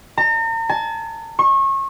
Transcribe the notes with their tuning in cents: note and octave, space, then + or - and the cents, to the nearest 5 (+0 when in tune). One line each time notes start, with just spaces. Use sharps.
A#5 -40
A5 -45
C#6 -30